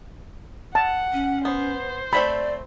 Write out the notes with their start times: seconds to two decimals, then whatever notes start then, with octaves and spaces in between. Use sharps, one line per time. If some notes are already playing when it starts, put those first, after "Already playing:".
0.75 F#5 A5
1.13 C#4
1.45 B3 C5
2.13 A3 C4 A4 D5 B5